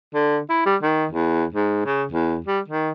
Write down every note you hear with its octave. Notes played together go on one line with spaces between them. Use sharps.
D3
E4
G3
D#3
E2
G#2
C#3
E2
G3
D#3